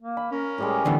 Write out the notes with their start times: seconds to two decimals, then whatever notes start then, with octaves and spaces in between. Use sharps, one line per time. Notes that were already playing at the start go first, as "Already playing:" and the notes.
0.02 A#3
0.17 B5
0.32 C#4 A#4
0.58 A2 G3 G#3
0.86 D3 E3 B3